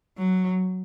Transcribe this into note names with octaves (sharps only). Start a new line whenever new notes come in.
F#3